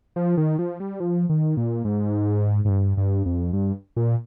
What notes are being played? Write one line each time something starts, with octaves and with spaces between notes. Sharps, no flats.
F3
D#3
F3
G3
F3
D#3
A#2
G#2
G#2
G2
G2
F2
G2
A#2